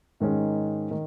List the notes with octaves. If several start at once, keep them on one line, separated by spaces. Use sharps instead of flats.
G#2 D#3 G#3 C#4
D#3